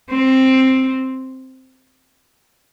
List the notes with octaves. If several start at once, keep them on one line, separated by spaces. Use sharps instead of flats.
C4